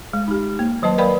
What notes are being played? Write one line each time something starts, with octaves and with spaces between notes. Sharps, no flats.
G#3
D#4 G4
A#3
D#3 F#3 B4 D#5 A5
A#4 B4 D5 F5 G5 B5